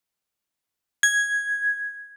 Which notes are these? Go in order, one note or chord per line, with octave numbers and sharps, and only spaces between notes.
G#6